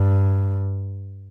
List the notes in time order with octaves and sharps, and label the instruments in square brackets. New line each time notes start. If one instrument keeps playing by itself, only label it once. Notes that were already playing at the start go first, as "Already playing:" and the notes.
Already playing: [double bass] G2